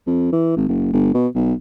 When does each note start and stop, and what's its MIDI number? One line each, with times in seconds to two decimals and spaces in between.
0.07 0.31 41
0.32 0.54 52
0.56 0.67 32
0.69 0.92 30
0.93 1.11 31
1.14 1.27 47
1.35 1.53 35